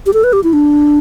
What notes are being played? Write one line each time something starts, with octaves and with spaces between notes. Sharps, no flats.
G4
A4
B4
G4
E4
D4